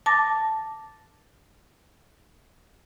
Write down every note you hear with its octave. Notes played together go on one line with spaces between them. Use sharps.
A5 D6 A6 A#6